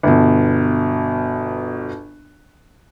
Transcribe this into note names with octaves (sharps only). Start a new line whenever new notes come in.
G1 B2